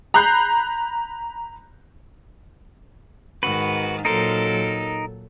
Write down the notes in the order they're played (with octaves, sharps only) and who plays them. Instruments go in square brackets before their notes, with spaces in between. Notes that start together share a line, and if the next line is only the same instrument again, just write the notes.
[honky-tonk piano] A#5 B5 F#6 G6 C7
[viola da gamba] G#2 D#3 [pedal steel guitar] F#4 B4
[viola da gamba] A#2 F#3 A4 [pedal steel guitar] D#4 A#4 C5